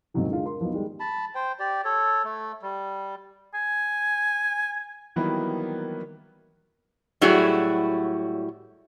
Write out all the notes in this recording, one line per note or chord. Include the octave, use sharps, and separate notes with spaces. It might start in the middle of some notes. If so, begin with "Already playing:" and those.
D#2 G#2 C3 D#3 F#3 G3
D3 G#3 F4
A#4 C6
F3 F#3 B3 D#4
D#3 G3 G#3
A5 B5
C5 G5
G4 D5
A4 C#5
A3
G3
G#5
D#3 E3 F#3 G3 A#3 B3
A2 F#3 G3 E4 F#4 G#4